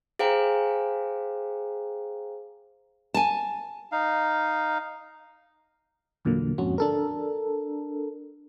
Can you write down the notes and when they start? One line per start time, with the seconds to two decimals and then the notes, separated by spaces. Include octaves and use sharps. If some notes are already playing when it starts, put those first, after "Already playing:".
0.19 G#4 C5 F5 G5 G#5 A#5
3.14 G#5 A5
3.92 D#4 F5
6.25 E2 A#2 D3 F#3 A#3
6.58 F2 G#2 C#4 F#4
6.78 D4 A4 A#4